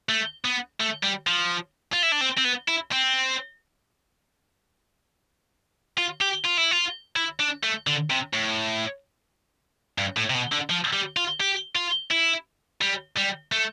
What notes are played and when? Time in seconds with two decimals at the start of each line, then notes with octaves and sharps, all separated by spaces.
0.09 A3
0.45 B3
0.80 A3
1.03 G3
1.27 F3
1.93 F4
2.03 E4
2.12 D4
2.21 C4
2.38 C4
2.45 B3
2.68 E4
2.92 C4
5.98 F4
6.21 G4
6.45 F4
6.58 E4
6.71 F4
7.16 E4
7.40 D4
7.63 A3
7.87 D3
8.10 C3
8.34 A2
9.98 G2
10.17 A2
10.30 C3
10.34 B2
10.52 D3
10.69 F3
10.93 G3
11.17 F4
11.40 G4
11.75 F4
12.11 E4
12.81 G3
13.17 G3
13.52 A3